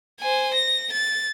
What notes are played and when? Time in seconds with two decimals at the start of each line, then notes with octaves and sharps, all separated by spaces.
0.20 C5 G#5
0.54 A#6
0.92 A6